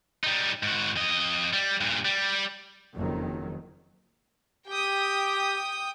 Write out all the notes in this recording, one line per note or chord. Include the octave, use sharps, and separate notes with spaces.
G3 D#4
G#2 F#4
F2 D#5
G3
G2 A#2
G3
F#1 F2 D#3 F#3
G4 G5 D#6